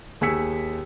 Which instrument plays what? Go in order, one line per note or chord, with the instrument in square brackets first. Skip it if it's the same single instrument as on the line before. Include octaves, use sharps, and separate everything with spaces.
[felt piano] D#2 G#4 G#5 E6 B6 C#7